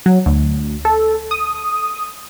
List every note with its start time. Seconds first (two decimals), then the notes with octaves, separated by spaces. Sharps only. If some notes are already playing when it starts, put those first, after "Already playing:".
0.06 F#3
0.26 D2
0.85 A4
1.31 D#6